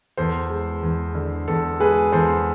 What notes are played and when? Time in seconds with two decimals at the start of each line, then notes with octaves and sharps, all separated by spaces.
0.17 E2 A4 C5
0.50 G#3
0.83 E2
1.15 D3
1.48 E2 A4
1.80 G#3 G#4 B4
2.12 E2 A4 C5